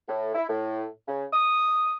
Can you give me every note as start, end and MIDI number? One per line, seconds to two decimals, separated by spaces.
0.08 0.35 45
0.35 0.44 64
0.49 0.85 45
1.08 1.25 49
1.33 1.94 87